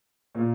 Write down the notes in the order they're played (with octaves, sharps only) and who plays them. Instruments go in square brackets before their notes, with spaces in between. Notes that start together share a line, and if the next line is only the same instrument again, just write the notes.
[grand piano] A#2 A#3 F4